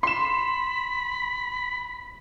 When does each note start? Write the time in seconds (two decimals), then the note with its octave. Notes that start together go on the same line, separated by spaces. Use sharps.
0.03 B5 C6 E7